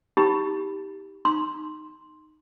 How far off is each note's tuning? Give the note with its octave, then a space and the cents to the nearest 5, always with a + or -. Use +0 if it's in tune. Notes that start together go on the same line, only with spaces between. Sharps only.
D#4 +40 G4 +0 B5 +0
D#4 -20 C6 +5